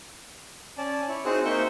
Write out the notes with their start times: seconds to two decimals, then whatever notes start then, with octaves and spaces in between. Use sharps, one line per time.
0.78 C#4 D5 A5
1.09 E4 C#5
1.25 C4 D#4 F#4 G#4 C5 F#5
1.45 A#3 D#4 C5 E5 G5 C#6